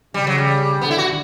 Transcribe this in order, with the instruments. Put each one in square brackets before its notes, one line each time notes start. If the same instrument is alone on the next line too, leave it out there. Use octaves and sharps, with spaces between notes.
[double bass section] C#3 [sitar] G3
[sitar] F#3
G3
[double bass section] D3 [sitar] B3
[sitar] E4
F#4